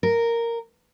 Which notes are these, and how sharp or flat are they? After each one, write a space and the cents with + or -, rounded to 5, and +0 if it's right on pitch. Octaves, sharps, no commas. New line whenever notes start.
A#4 -5